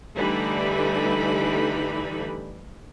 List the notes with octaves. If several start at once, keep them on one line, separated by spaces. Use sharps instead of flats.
D3 E3 G3 A3 D#4 B5